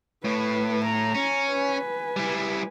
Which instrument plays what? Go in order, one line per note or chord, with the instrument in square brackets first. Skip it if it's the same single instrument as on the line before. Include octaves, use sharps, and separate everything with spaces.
[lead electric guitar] A2 [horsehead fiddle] B4
[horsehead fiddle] A#5
[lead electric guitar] C#4
[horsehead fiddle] B4 G#5
[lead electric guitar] G3 E4